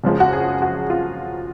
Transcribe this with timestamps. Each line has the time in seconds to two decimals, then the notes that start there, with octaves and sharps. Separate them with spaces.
0.04 F#1 F#2 F3 G#3
0.20 F#4
0.33 G#4
0.62 F#4
0.90 F4